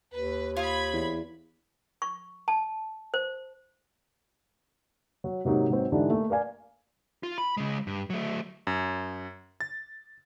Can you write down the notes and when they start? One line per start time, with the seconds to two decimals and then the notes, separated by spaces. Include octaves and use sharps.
0.14 D#2 B4
0.57 F4 B5 D#6 G#6
0.93 E2
2.02 C#6
2.48 A5
3.14 C5
5.24 F#3
5.45 G#2 C3 F#3 A#3 D#4
5.70 G#2 F#3 C4
5.92 G#2 D3 E3 D4 D#4 G4
6.10 A3 A#3
6.30 A#4 D5 F5 G#5
7.23 F4
7.38 B5
7.57 C#3 G#3
7.87 G2
8.10 F#3 A3
8.67 F#2
9.61 A6